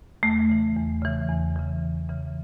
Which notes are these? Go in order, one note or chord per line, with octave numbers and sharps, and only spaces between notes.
E2 A3
C#3 E3
E2
C#3 E3
E2
C#3 E3
E2
C#3 E3